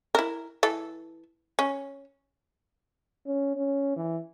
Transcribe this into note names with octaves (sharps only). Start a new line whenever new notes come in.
E4 A#4
E3 A4
C#4
C#4
C#4
E3